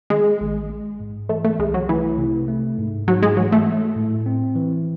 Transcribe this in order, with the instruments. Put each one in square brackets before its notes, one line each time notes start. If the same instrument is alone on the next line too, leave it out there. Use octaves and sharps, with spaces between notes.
[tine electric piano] D#3 [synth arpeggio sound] G#3
[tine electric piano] A1
G#3
G#2
[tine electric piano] E3 [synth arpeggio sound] A3
[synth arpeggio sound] A3
[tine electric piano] C2 [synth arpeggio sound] G#3
[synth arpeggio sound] F#3
[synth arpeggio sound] E3 [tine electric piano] A3
[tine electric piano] C3
A3
G#2
[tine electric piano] G#2 [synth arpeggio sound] F#3
[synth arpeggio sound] G#3
[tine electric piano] E3 [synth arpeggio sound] F#3
[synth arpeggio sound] A3
[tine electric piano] A3
A2
C4
E3